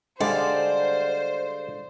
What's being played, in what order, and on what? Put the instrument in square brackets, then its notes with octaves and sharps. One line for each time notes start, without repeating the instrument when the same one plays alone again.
[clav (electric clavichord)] D3 G3 G#3 [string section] C5 [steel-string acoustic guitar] D5 F5